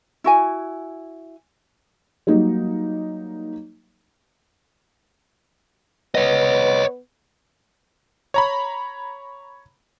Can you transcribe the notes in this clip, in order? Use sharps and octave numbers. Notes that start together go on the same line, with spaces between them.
E4 F#4 G#5
F#3 G3 A#3 D#4
B3 C#5 D#5
C#5 A#5 B5